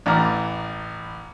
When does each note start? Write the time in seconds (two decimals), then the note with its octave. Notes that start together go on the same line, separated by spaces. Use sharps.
0.06 A1 E3 D5 A#5 F6